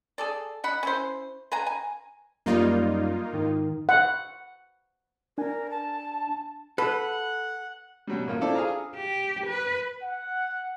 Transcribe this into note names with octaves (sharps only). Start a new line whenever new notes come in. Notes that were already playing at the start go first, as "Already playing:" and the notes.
G#4 A4 D5
B2 F#5 B5
C#4 E4 C5
B4 F5 G#5 A#5
G#5
F#2 G3 A#3 D#4 F4
G#2 D#3
F#5
D4 A#4 G#5
A5
A4 B4 F#5
B2 F#3 G3
A1 A#3 F4
C4 D4 E4 F4 A4 D5
F4 G#4 F5 A#5
G4
B4
F#5